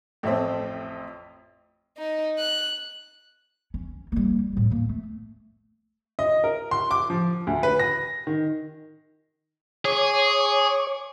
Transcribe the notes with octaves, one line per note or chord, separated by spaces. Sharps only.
A1 F2 A2 C4 E5
D#4
F#6
C#4
G3 A#3
A2 G3
A#3 C#4
A3
D#5
A#4
C6
D6
F3
D2
B4
A#6
D#3
G#4 C#5 C#6 D6